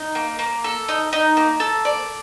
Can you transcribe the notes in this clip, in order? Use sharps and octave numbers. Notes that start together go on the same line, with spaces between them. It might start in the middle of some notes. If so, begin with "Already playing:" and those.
Already playing: D#4
A#3
A#3
A4
D#4
D#4
A#3
A4
D5